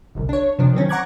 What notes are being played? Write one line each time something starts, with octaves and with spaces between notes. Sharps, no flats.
G1 C2
D4 C#5
C3 F3 D4
D#3 F#3 C4 C#4
F#5 A#5 C#6 D6 F#6 G#6